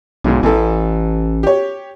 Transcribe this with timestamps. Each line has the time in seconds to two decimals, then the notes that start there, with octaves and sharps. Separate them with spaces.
0.24 B1 G#2 B2
0.43 A1 E3 A4
1.43 G4 C#5